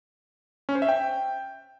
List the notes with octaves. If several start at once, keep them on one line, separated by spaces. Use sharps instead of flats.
C#4
C5
E5
G5